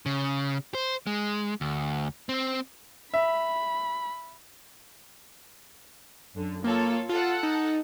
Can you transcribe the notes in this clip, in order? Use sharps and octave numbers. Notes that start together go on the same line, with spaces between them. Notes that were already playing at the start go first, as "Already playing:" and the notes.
C#3
C5
G#3
D2
C4
E5 B5
F#2 D3
A#3 F4 A4 C#5
F4 A4 F#5
D#4